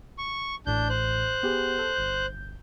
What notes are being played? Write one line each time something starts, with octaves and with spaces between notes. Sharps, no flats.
C#6
A1 A2 D4 G6
C5 F#6
B3 G4 G#4
A4
G1 G6